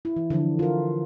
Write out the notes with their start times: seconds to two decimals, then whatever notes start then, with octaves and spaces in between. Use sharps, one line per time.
0.05 E4
0.16 E3
0.30 D3 E3 F3 D4
0.59 F4 A#4